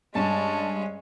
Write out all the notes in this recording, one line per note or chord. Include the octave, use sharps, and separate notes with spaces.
G2 G#3 C#4 A5